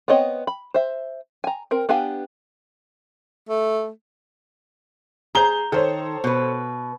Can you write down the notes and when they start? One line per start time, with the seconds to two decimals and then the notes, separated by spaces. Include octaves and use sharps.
0.08 B3 C4 C#5 D#5
0.47 B5
0.74 C5 E5
1.44 G#5 A#5
1.71 C4 A#4
1.89 B3 D4 G4 F5 G#5
3.49 A3
5.35 G#4 C5 A#5 G7
5.72 D#3 A4 C5 C#5
6.24 B2 B4